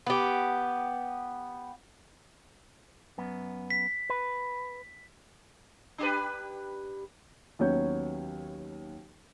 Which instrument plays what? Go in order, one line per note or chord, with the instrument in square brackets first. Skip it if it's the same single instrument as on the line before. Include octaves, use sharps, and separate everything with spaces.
[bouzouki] B3 G4
[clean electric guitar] F#2 B3
[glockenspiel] B6
[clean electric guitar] B4
[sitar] D4 G4 B4
[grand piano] D#2 F#3 B3 C#4 C#5 G6